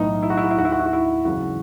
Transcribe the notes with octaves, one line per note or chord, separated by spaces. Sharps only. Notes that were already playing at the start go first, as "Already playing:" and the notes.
Already playing: B1 A2 E3 D#4
E4
F#4
E4
F#4
E4
D#2 D#3 F#4
E4
F#4
E4
F#4
E4
G#1 F#2 C#3 E3 F#4